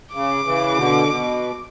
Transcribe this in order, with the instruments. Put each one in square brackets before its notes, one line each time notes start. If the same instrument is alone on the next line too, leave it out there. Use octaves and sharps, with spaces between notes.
[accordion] C#3 [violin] D6
[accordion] C#3 E3
B2 D3
B2